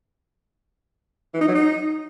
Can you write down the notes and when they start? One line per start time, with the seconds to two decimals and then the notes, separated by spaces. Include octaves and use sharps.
1.34 E3
1.41 D#4
1.48 F#3
1.55 D#4